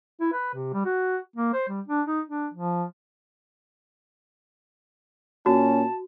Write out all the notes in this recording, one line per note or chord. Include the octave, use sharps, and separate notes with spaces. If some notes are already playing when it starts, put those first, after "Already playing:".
E4
B4
C3
G3
F#4
A#3
C5
G3
D4
D#4
D4
F3
A#2 C#4 F#4 A5